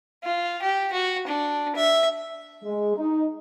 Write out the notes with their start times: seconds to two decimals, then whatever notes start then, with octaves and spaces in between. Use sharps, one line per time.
0.24 F4
0.62 G4
0.92 F#4
1.27 D4
1.76 E5
2.64 G#3
2.97 D#4